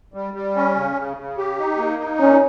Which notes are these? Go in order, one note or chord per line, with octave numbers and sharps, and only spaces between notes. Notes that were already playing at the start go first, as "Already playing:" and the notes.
G3
G3
C#4
C#3
C#3
C#3
G4
D#4
A#3
D#4
A#2 C#4